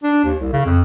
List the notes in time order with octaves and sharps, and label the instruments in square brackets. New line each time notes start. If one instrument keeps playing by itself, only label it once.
[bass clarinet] D4
D#2
C2
C#3
F2